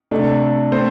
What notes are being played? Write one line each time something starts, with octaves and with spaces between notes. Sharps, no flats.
C3 A3 D4 A4
A3 C4 A4 C5